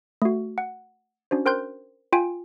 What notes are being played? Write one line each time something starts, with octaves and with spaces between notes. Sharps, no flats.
A3 F#4
F#5
C#4 D4 F#4 C5
A#4 C5 G5 C6 F#6 G6
F4 G5 G#5